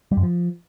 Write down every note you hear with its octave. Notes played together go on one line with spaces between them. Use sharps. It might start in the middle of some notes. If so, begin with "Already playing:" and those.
G3
F#2
F3